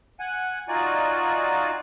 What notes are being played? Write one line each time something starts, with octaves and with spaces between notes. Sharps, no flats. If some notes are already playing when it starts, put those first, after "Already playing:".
F#5 G#5
D#4 F4 F#4 D5 G#5